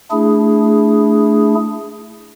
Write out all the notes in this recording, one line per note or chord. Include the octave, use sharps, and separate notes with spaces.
A3 D4 E4 G#4